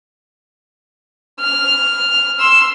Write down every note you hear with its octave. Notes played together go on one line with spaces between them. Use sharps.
F6
C6 E6